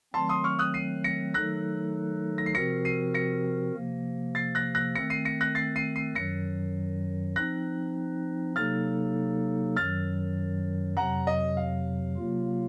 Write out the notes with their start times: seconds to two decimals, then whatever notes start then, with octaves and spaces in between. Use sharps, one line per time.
0.14 D#3 F#3 A3 C4 A5 C6
0.29 C6 D#6
0.44 C#6 F6
0.59 D#6 F#6
0.74 C7 D#7
1.04 A#6 C#7
1.34 D#3 F#3 A3 D#4 A4 F#6 A#6
2.38 A#6
2.46 C7
2.54 C3 F3 C4 F#4 A#4 A#6 C#7
2.85 C7 D#7
3.14 A#6 C#7
3.75 C3 F3 A#3
4.35 A6 C7
4.55 F#6 A#6
4.75 F#6 A#6
4.95 D#3 A3 C4 A#6 C#7
5.10 C7 D#7
5.25 A#6 C#7
5.41 F#6 A#6
5.55 A6 C7
5.76 C7 D#7
5.96 C7 D#7
6.15 F#2 D#3 F#3 A#6 C#7
7.36 F3 C4 D#4 F#6 A#6
8.56 C3 F#3 A#3 D#4 A4 F6 A6
9.76 F#2 D#3 F#3 F6 A6
10.97 F2 C3 F#3 F#5 A#5
11.27 D#5
11.57 F5
12.17 C3 F#3 A#3 F4